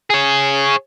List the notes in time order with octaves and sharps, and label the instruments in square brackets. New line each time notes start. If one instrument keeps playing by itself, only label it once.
[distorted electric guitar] G#4 C#5